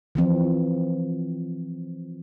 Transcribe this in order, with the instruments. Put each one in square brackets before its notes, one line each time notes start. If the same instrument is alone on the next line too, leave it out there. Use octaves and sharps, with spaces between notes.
[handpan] E3 F3 C4